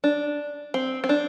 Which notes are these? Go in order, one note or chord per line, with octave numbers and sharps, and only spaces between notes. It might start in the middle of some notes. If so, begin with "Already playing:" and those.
D4
C4
C4
D4